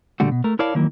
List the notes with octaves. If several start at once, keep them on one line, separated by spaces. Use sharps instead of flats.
A#2 D3 G3 A3 F#4
B2
A3 A#4
E4 A#4 C#5 D5 F5 A5
D#3 E3 F#3 A#3